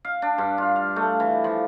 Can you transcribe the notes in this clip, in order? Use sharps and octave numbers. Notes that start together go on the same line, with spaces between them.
F5
D4
G2
F4
F5
A3
E3
F3